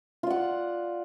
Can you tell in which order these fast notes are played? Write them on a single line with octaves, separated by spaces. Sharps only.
F4 D5 F#5